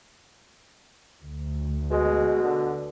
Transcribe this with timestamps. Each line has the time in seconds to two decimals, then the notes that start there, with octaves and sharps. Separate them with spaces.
1.24 D2
1.90 B2 G#3
2.44 D3